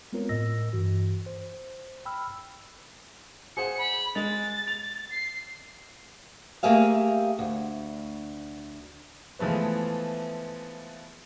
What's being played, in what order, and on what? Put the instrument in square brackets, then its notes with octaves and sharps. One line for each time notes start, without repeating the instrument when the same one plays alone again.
[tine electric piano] G#3 B3 C4 F4 A#4 C#5
A2 A#4 D#5 E6 A#6
G2 E3 F#4
C5
G5 B5 E6 F6
[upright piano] G#4 C5 F#5 [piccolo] C#7
[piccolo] B5
[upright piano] G#3 F7 [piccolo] A6
[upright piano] F7
[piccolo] C7
[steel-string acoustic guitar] A3 A#3 G4 G#4 E5 F5
D2
[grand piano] E3 F3 G#3 A3 B3